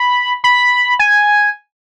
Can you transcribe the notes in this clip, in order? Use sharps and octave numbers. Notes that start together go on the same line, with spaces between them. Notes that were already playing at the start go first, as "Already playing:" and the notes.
Already playing: B5
B5
G#5